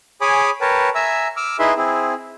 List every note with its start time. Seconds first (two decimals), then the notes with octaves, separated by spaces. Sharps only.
0.21 G#4 C#5 G#5 B5 D6 D#6
0.61 A#4 B4 C#5 G5 A5
0.95 E5 G#5 A#5 E6
1.37 D6 E6 F6
1.59 D#4 E4 G#4 B4 E5 C6
1.77 C4 E4 G#4